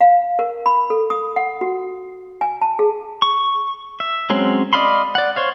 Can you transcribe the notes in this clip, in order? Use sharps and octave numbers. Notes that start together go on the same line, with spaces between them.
F5
A#4
B5
A4
D#6
F#5
F#4
G#5
A5
G#4
C#6
E5
F#3 G#3 C4 C#4
D5 D#5 F5 B5 C6
D5 F#5
C5 C#5 F5